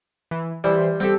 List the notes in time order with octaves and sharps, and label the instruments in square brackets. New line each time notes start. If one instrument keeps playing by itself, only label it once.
[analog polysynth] E3
[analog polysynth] E3 E4 C5 [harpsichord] G3
[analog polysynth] G3 A4 [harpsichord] C4 G4